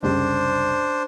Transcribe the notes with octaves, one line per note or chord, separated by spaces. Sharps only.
F#1 C2 D4 G4 C5